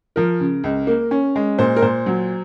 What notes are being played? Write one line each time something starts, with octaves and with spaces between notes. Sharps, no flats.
F3 A#4
C#3
C#2
A#3
C#4
G#3
A#2 C5
A#4
A#2 C5
F#3